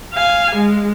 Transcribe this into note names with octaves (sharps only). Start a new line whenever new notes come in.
F5 G#5
G#3